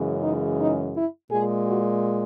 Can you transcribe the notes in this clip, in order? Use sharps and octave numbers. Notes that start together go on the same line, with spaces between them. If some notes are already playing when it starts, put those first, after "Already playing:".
Already playing: F#2 C#3 E3 G#3
D#4
D#4
E4
A#2 G#3 G#4
F#4